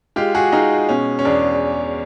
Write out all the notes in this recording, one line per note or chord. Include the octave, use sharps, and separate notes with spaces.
G#3 F4 G4
F#4 G#4
G#3 D#4 F4
B2 C#4
C#4
E2 D4